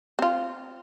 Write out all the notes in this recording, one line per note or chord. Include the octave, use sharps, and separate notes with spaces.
C4 F4